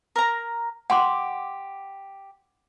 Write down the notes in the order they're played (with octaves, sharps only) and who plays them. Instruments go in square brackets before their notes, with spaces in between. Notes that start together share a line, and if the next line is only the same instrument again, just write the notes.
[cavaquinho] A#4 A#5
[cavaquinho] G4 [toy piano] F#5 C6 D6